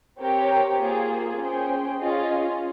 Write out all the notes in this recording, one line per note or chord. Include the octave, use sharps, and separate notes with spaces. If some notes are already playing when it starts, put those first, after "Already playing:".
C4 G4 A#4 C#5 G5
A#3 F4 G#4
C#4 G#4 C5 G5
C#4 F4 G#4 D#5